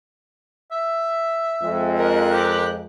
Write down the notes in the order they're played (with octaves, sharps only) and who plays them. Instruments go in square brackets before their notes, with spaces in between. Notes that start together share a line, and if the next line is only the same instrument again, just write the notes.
[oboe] E5
[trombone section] F2 G#3
[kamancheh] A#4 F#6
[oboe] G4